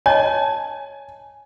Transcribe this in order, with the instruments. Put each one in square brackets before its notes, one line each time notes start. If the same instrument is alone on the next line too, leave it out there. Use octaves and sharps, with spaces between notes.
[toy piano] C#5 D#5 A5 [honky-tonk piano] G#5